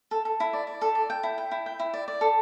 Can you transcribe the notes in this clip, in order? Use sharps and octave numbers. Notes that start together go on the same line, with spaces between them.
A4
A4
E4
D5
D5
A4
D5
G5
E4
G5
E4
G5
E4
D5
D5
A4